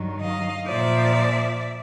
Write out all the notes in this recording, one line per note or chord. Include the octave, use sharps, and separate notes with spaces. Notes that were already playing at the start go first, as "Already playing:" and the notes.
Already playing: G2 D#3 F#3
D#5 F5
A#2 F3 D5 E5